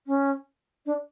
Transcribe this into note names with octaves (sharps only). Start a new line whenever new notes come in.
C#4
D4